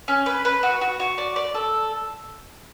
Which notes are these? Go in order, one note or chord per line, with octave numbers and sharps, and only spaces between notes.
C#4
B4
B4
F#4
F#4
F#4
D5
D5
A4